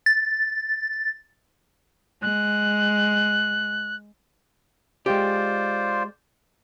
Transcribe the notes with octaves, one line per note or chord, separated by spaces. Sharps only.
A6
G#3 F#6
G#3 F4 G4 C5 D5